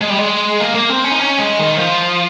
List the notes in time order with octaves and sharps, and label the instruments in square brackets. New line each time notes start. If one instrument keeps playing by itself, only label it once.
[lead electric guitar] G#3
G3
G#3
A#3
A#3
C4
C#4
D#4
C#4
G#3
D#3
F3